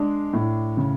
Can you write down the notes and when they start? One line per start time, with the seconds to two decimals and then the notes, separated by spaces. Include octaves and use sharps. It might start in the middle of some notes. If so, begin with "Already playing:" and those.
Already playing: G#3 D4
0.33 A2
0.77 C#3